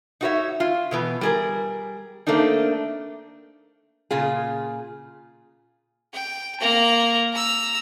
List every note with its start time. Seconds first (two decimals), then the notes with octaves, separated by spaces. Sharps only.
0.21 D#4 E4 F#4 B4 C#5 E5
0.60 F4
0.91 B2 E3 B3
1.21 G3 G#4 A#4
2.27 A3 A#3 C4 D4 D#4
4.11 A#2 C#3 F4 G#4
6.14 G5
6.61 A#3 A#5
7.33 A#5 E6